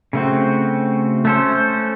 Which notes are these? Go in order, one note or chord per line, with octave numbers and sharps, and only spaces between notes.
C#3 A3 C4 F#4
A3 C#4 A4 C5